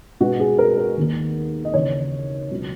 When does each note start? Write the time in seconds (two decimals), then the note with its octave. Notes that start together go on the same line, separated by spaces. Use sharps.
0.20 B2 G#3 B3 F#4
0.40 G#4
0.59 A#4
0.78 A#4
0.97 D#2 D#3 A#3
1.65 D#5
1.74 D#2 C#3 E3 C#5
2.51 C#2 B2 F#3